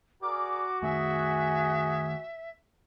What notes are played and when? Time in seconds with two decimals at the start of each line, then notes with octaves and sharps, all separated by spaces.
0.23 F#4 G#4 A#4 D5 D6
0.83 D#3 A3 G#4 E5